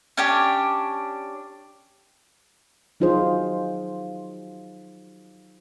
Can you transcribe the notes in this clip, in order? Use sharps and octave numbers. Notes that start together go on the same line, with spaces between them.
C#4 D4 G4
F#3 D#4 F4 G#4 C5